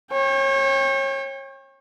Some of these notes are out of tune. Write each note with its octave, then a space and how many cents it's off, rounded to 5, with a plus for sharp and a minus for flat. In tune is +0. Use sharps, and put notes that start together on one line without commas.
C#5 -30 G5 +30